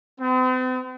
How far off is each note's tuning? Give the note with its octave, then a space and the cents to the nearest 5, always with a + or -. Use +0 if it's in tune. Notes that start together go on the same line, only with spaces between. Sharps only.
C4 -45